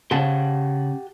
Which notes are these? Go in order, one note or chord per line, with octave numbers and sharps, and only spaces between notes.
C#3 G4 F#5 A5